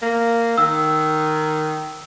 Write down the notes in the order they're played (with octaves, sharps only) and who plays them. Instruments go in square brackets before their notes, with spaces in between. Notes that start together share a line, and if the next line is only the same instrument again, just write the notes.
[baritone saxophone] A#3
[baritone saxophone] D#3 [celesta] E6